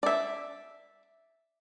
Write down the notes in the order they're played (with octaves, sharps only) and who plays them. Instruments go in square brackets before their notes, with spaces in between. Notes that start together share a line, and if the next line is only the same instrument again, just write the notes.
[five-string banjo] D5 E5